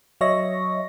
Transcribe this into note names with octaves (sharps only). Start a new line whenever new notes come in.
F#3 C#5 D#5 E5 C#6 A#6